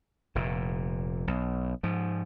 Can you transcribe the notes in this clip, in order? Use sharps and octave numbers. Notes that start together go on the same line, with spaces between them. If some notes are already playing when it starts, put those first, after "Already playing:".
F1 A#2
B1
G#2 F3